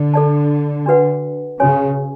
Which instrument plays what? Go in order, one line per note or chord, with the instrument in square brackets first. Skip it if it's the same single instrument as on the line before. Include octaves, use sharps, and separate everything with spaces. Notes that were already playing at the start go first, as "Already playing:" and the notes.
Already playing: [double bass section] D3
[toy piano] A4 D5 A5
D4 F#4 B4 F#5
[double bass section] C#3 [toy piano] C#4 F#4 C#5 G#5